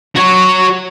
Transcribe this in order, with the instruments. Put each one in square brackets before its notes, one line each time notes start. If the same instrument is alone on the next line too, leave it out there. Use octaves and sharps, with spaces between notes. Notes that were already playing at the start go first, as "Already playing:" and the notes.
[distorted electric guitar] F#4 C#5